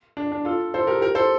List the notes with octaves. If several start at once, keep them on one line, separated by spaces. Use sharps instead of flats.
D4
D4
F4 A4
A4 C5
G4 A#4
G4 A#4
A4 C5